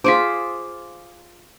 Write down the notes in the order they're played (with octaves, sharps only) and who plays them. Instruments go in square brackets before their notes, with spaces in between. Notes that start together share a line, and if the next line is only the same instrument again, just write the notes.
[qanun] F4 G#4 C5 [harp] D6 B6